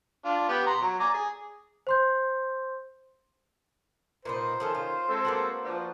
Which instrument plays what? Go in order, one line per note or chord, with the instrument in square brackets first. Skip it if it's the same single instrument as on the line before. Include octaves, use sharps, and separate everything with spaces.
[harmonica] D4 F4
B3 G4 B4
A#5 C6
F#3
D5 G#5 A#5
G#4
[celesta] C5 C6 G6
[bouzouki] A#2 B3 D#4 [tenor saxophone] C5
[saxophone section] D#3 C#4 [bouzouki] F3 A4 A#4
[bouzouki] F4
[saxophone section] G#3 C4 A4
[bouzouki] A#3 B3 F#4
[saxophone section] F3 D4